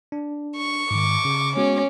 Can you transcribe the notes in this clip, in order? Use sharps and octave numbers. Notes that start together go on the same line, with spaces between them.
D4
C#6
G#2 D#3 D6
C#3
G#3 B3 C#4 F#4